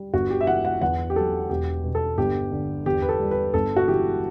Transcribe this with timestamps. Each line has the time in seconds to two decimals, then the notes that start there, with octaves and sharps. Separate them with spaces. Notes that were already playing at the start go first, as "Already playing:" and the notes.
Already playing: G3
0.14 G1 F#4
0.30 G4
0.41 E5
0.47 E3 F#5
0.65 F#5
0.81 E2 F#5
1.10 G4
1.16 F#3 A4
1.50 E1 G4
1.83 B2
1.95 A4
2.18 G1 G4
2.52 D3
2.86 E2 G4
3.02 B4
3.09 A4
3.20 G3
3.31 B4
3.54 G1 A4
3.76 F#4
3.88 E3 G4